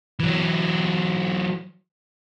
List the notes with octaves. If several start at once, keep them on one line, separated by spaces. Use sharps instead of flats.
E3 F#3